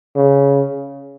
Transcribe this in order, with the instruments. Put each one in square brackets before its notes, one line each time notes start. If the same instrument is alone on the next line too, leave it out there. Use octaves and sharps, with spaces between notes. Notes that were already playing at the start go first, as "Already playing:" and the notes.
[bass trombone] C#3